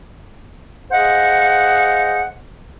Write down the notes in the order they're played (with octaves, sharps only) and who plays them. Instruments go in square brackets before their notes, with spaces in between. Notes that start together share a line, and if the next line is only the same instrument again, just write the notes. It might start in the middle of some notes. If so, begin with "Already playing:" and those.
[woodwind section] G#4 C5 D#5 F5 F#5